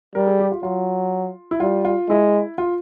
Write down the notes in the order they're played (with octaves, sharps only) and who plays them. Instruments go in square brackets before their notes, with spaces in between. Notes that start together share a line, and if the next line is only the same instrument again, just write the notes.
[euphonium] G3 [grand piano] A#4
[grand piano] G#4
G4
F4
[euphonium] F#3 [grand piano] F4
[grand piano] E4
[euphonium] G3 [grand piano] F4
[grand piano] F4
[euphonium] G#3 [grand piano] E4
[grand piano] F4